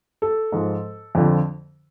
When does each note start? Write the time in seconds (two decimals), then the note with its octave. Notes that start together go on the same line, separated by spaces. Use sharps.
0.22 A4
0.52 G#2 F3
1.15 F2 D3 F3